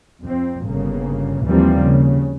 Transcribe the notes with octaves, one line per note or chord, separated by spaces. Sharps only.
F2 C4
G1 C#3 A#3
D#2 E3 F3 G3 A#3 C4
C#3